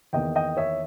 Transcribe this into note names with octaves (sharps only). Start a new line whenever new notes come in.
E2 D#3 A#3 D#5 G5
D#5 G5
C#5 E5